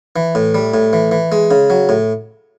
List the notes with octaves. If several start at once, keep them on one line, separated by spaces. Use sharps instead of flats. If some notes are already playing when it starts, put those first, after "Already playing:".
E3
A2
G3
A2
E3
E3
G#3
C#3
F#3
A2